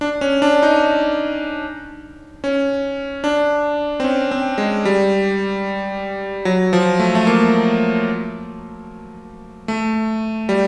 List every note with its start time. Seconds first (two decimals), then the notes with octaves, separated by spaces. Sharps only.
0.01 D4
0.21 C#4
0.42 D4
0.63 D#4
2.44 C#4
3.24 D4
4.00 C4
4.04 C#4
4.31 C4
4.58 G#3
4.85 G3
6.45 F#3
6.73 F3
7.00 A3
7.15 A3
7.27 A#3
9.68 A3
10.49 G3